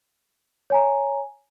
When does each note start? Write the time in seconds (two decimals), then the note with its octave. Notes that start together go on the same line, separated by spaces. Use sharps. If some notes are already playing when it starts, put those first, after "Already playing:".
0.70 C#5 G#5 A#5